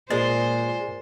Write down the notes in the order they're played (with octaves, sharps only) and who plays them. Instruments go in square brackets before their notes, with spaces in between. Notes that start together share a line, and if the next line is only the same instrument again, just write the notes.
[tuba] A#2 [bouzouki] G#3 [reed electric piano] A#4 D5 A6 [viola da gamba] C5